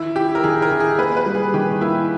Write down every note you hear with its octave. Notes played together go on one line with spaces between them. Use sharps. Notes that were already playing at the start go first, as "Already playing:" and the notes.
Already playing: D#3 E4
D#4 G4
A#4
D#3 G#4
A#4
D#3
G#4
A#3 B4
B4
G3
G#4
D#3 G4
A#3 E4